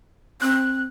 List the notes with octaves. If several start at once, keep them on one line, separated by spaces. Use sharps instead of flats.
C4 F#6